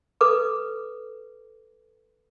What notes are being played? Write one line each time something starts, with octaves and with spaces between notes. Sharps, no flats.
A4 B4 D6